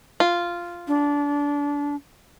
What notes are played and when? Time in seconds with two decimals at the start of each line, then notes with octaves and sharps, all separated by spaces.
0.20 F4
0.88 D4